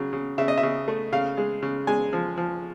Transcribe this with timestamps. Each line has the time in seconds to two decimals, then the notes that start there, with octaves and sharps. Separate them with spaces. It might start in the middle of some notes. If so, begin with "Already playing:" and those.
Already playing: C#3 F#3
0.13 C#3
0.38 C#3 E5
0.48 D#5
0.58 E5
0.63 C#3
0.88 A3
1.13 C#3 F5
1.37 G#3
1.62 C#3
1.87 G#3 G#5
2.13 F3
2.38 F3